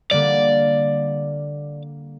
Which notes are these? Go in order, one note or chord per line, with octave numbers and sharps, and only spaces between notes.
D3 G3 A#3 D5